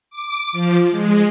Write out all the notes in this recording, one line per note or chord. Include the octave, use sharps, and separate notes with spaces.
D6
F3
G#3